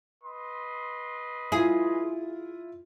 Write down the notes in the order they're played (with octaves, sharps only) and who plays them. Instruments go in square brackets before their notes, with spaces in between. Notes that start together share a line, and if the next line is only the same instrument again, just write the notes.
[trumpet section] B4 D#5 C6
[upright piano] E4 F4 [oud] G#4